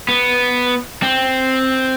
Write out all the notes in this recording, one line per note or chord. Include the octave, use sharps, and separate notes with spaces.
B3
C4